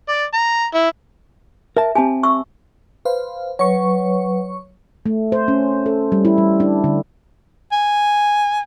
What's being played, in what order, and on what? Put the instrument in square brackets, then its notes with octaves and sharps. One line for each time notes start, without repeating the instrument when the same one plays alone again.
[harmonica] D5
A#5
E4
[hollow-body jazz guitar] A#4 A5 [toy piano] E5
[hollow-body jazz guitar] C4 G4 [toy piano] G#5 A5
[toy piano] E5 C#6 E6
[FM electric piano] B4 C5 F5
[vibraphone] F#3 B4 [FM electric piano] C#5 C#6
[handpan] A3
C5
C#4
A4
G3
E4
G3
D4
D3
[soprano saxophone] G#5